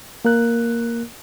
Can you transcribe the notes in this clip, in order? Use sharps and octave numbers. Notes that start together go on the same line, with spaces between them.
A#3 A#4 F#6